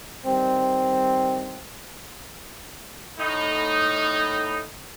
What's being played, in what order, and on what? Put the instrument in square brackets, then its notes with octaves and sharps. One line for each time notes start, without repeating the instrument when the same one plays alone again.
[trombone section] D#3 G3 C4
[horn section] A2 D#4